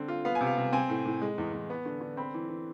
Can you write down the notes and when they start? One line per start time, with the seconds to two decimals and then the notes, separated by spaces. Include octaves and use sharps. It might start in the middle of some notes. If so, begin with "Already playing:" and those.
Already playing: D3 C4
0.08 F4
0.25 B3 F5
0.35 G#5
0.41 C3
0.47 F5
0.58 C3
0.72 C4 G#5
0.89 A2
1.05 A2
1.22 G#3
1.38 E2
1.53 E2
1.70 B3
1.85 D3
2.01 D3
2.17 C4 B5
2.34 E3
2.49 E3